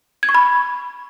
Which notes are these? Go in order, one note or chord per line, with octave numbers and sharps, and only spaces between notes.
G#6
C#6
B5